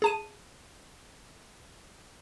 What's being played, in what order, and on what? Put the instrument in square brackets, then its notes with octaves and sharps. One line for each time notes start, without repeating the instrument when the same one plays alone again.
[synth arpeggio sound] G#4 A5 D#7